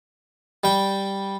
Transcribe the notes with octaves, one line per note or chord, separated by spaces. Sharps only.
G3 G5